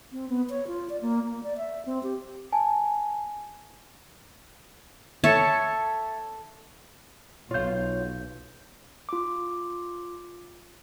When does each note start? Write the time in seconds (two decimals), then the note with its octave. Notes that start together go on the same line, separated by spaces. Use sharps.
0.12 C4
0.29 B3
0.50 C#5
0.67 F4
0.90 D5
1.02 A#3
1.24 A#3
1.43 D5
1.57 E5
1.86 C4
2.03 G4
2.52 G#5 A5
5.24 A4 C#5 E5 A5
7.51 B1 F4 C#5 F5 G6
9.09 F4 D6